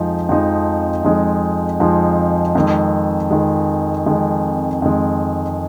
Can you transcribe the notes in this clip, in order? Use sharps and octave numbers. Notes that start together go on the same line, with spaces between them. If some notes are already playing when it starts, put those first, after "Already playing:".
Already playing: F2 F3 G#3 D#4
F2 F3 G#3 D#4
F2 F3 G#3 D#4
F2 F3 G#3 D#4
F2 D#3 G#3
F2 D#3 G#3
F2 D#3 G#3
F2 D#3 G#3